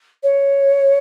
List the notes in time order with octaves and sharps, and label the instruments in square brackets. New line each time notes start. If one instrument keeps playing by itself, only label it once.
[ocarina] C#5